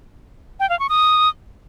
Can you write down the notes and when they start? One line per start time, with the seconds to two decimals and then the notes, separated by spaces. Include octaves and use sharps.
0.60 G5
0.69 F5
0.79 C#6
0.89 D#6